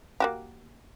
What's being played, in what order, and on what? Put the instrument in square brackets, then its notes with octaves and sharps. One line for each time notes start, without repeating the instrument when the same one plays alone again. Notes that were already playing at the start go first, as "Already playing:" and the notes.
[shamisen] A#3 F#4 G4